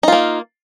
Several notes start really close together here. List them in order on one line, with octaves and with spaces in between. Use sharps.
D#4 F4 A#3